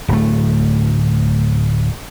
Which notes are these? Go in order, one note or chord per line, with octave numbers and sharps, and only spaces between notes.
D1 A3